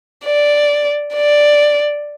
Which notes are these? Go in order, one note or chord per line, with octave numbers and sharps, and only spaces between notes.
D5
D5